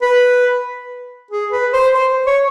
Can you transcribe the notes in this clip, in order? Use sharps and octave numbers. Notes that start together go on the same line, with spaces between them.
B4
G#4
B4
C5
C5
C#5